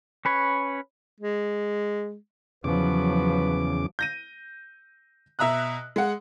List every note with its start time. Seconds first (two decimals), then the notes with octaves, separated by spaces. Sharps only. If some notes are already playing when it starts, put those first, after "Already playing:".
0.25 C#4 B4 C#5
1.21 G#3
2.64 E2 C#3 F3 F#3 B4 D6
3.99 G6 A#6 D#7
5.39 B2 E5 A#5 D#6 F#6
5.96 G#3 F#5